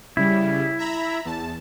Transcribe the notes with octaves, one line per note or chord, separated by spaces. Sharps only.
C#3 G3 E4
E5 A#5 B5
E2 A5